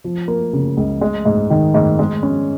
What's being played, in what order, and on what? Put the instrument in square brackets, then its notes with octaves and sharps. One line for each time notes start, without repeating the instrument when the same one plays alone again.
[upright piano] F3
A#3
C#3
C#2
G#3
G#2
D#3
G#2
G#3
C#4